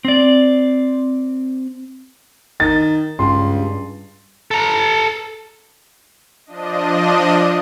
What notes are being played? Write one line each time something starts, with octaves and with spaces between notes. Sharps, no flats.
C4 D5
D#3 A6
C#2 G2 C6
A4 A#5
F3 D4 D#5